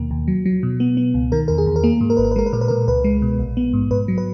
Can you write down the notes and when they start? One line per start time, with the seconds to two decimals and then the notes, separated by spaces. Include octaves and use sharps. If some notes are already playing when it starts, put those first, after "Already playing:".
Already playing: D#2 B2 A#3
0.11 D#2
0.28 F#3
0.46 F#3
0.63 B2
0.80 B3
0.97 B3
1.14 C#2
1.32 D#3 A#4
1.48 E2 A#4
1.58 G#4
1.66 E2
1.76 A#4
1.84 A#3 G#4
2.01 G#2
2.10 A#4
2.17 G#1 B4
2.25 A#4
2.31 B4
2.36 G#3 A#4
2.46 B4
2.53 A#2 A#4
2.61 B4
2.68 A#2 A#4
2.88 C#2 B4
3.04 G#3
3.22 B2
3.39 A#1
3.57 B3
3.74 G#2
3.91 G#2 B4
4.08 F#3
4.18 B4